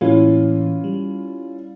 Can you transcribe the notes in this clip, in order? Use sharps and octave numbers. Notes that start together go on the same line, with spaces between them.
A2 E3 A#3 C#4 E4 F4
G3